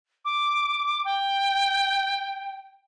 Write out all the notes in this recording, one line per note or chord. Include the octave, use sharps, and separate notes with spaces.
D6
G5